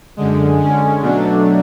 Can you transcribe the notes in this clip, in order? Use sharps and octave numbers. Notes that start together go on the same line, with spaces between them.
F#2 D3 G#3
D3 G#3 C#4
B2 F#3 A3 D4